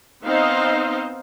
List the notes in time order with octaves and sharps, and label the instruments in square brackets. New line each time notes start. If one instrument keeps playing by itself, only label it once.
[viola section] B3 C4 D#4 C5 D#5 F5